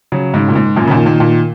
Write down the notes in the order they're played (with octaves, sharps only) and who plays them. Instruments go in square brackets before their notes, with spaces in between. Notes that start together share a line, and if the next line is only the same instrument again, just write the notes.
[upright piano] C#3 F#3
G#2 C#3
A#2
G#2
F#2 A#2
C#3
A#2 D#3
A#2 D#3
A#2 D#3